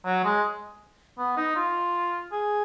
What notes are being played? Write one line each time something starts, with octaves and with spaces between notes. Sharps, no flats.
F#3
G#3
B3
D#4
F4
G#4